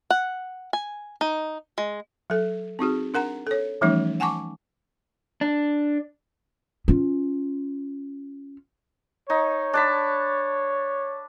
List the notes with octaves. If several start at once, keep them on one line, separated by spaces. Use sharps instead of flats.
F#5
G#5
D#4
G#3
F#3 A4
C4 D#4 F#4 G#4
D4 A#4 F#5 A#5
A4 C#5
E3 F3 G3 A3 C#4 D#4
F#5 G#5 A5 C#6 D6
D4
C#4 F4
D#4 C#5
D4 A5 B5